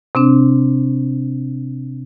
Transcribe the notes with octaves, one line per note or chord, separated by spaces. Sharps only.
C3 C4 D4